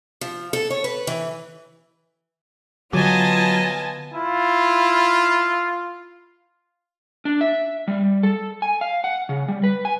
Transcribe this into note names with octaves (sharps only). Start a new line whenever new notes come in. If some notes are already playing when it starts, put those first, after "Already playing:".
F3
A4
C#5
B4
E3
D3 F#3 B3 F4 D#5 G#5 A5
E4 F4
D4
E5
G3
A4
G#5
F5
F#5
C#3
G3
B4
G#5